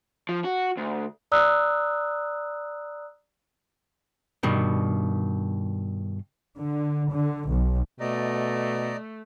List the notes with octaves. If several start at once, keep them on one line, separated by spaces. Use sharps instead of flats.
F3
F#4
D2
D5 A#5 D#6 E6 F#6
G2 B2 D#3
D3
D3
B1
B2 A3 D5 D#5 A#5